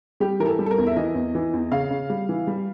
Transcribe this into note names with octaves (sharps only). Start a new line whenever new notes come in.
G3 G4
E3 A#4
A4
G3
A4
A#4
E2
E5
E3 D#5
E2
E3
E2
C#3 F5
C#3
G3
E3
G3